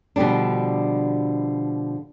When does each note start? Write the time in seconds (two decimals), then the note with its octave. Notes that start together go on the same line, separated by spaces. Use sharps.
0.16 B2 D3 F3 G3 D4